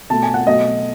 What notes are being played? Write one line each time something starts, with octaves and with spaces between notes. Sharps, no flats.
B2 A3 A5
G#5
F#5
B2 F#3 A3 D#5